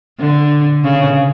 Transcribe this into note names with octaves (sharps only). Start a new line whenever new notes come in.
D3
C#3